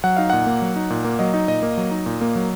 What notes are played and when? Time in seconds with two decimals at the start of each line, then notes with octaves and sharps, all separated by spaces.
0.04 F#3 F#5
0.17 D#4 F5
0.30 A#2 F#5
0.47 A#3
0.62 F#3
0.76 D#4
0.90 A#2
1.04 A#3
1.19 F#3 D#5
1.34 D#4
1.48 A#2 D#5
1.62 A#3
1.77 F#3
1.91 D#4
2.06 A#2
2.21 A#3
2.36 F#3